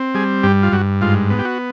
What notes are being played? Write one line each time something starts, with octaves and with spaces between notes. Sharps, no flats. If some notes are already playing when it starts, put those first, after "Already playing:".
Already playing: C4
G3 G#4
G2 G4
F4
G2 F#4
G#2 F4
B3
G4
F#4